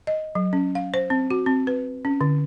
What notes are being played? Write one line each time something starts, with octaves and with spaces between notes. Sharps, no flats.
D#5
F#3
C#4
F5
C5
C4
F#4
C4
B4
C#4
D3